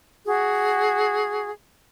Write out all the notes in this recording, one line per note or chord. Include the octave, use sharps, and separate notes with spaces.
F#4 G#4